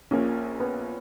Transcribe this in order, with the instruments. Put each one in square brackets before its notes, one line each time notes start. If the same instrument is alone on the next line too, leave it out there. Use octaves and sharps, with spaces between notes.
[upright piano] A#1 A#2 A#3 [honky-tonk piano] C#4
[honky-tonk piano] B3